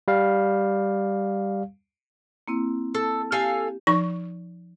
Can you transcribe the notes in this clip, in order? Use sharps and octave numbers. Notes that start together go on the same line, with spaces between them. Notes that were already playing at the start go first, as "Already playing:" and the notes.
G3 F5
A#3 C4 E4
A4
G4 A4 F5 G#5
F3 D#4 C#6